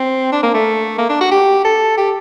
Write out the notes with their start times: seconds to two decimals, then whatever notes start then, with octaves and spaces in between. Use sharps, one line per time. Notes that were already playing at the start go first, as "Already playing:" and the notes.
Already playing: C4
0.32 D4
0.43 A#3
0.54 A3
0.98 A#3
1.09 D4
1.21 F#4
1.31 G4
1.64 A4
1.98 G4